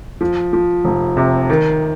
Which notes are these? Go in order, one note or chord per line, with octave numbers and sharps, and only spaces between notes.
F3
F3
F1
C3
D#3